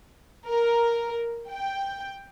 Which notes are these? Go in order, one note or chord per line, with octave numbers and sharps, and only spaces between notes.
A#4
G5